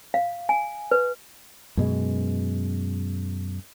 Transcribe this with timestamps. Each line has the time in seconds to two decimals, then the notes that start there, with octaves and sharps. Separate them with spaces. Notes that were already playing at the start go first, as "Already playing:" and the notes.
0.14 F5
0.49 G#5
0.91 B4
1.77 F#2 B2 G#3